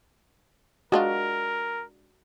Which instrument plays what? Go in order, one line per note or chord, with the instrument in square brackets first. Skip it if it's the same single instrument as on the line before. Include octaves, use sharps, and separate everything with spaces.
[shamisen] G#3 D4 F4 [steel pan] F#4 [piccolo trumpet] A#4